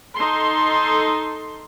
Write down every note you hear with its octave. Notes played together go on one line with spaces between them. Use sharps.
D#4 A4 C6